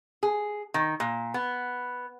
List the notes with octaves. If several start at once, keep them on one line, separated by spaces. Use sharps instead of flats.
G#4
D#3
A#2
B3